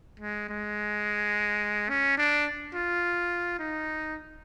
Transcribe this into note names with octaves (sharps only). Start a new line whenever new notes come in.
G#3
G#3
C#4
D4
F4
D#4